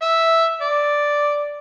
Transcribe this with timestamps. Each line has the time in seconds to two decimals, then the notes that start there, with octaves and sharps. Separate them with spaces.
0.02 E5
0.61 D5